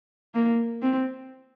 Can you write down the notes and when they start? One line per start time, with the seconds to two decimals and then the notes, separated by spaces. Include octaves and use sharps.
0.35 A#3
0.82 C4